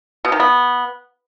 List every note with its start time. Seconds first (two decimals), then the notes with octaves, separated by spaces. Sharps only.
0.25 B2
0.32 D#3
0.40 B3